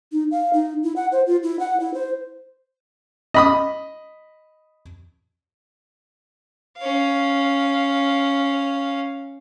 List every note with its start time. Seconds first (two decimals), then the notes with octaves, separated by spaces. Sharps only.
0.12 D#4
0.32 F5
0.53 D#4
0.83 E4
0.96 F#5
1.12 C5
1.26 F4
1.43 E4
1.60 F#5
1.80 E4
1.94 C5
3.34 D#5 B5 D#6
6.78 C#4 F5